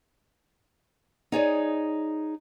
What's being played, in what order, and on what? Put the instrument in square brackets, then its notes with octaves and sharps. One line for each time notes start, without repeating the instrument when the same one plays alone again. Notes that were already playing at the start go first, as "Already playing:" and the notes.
[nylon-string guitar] D#4 G#4 C#5 D5